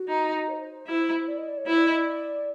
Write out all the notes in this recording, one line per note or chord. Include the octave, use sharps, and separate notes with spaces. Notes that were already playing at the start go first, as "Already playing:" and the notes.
Already playing: F#4
D#4
C#5
C5
E4
D5
D#5
D5
C#5
E4 C5
D5
D#5
D5